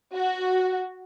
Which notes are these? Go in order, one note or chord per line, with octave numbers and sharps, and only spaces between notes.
F#4